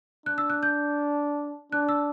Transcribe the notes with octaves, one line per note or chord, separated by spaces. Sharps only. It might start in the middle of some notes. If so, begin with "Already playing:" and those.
D4 F#6
E6
F#6
G6
D4 F#6
E6